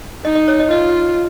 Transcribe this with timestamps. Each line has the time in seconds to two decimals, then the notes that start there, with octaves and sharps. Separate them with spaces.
0.24 D#4 D#5
0.35 D#5
0.48 C#5
0.60 D#5
0.70 F4 D#5